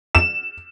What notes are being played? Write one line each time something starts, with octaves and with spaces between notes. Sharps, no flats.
E7